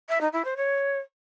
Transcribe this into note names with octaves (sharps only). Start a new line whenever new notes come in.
E5
D#4
E4
C5
C#5